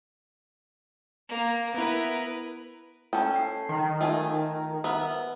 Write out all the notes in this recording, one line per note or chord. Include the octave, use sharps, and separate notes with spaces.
A#3
B3 E4 A#4 B4
C#4 A4 G5
C7
D#3
A3 F4 G#5
B3 A#4 E5